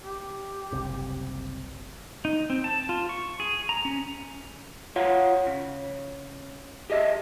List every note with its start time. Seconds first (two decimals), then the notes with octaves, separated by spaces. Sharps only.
0.02 G4
0.72 F#1 C2 C3
2.25 D#4
2.50 C4
2.64 A5
2.89 F4
3.09 C#6
3.40 G#4
3.69 A#5
3.85 C#4
4.96 F4 C#5 F5 F#5
5.47 C#3
6.90 G4 G#4 D#5 E5